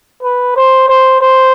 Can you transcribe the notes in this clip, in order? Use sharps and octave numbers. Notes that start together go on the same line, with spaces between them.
B4
C5
C5
C5